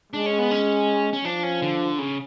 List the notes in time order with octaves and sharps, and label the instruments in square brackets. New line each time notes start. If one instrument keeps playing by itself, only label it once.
[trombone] G#3 [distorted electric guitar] D4
[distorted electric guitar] C#4
B3
C#4
C#4
[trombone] F3 [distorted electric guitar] D4
[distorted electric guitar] C#4
D3
C#3